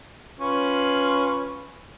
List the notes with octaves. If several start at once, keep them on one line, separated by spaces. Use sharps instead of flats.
C#4 F4 B4